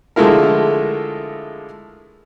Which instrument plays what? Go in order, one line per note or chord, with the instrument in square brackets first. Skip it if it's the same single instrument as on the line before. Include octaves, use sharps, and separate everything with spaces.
[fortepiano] D3 F3 G#3 A3 E4 A#4